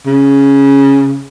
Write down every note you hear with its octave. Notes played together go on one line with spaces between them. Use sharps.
C#3